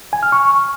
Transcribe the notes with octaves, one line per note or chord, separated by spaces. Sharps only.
G#5
F6
C#6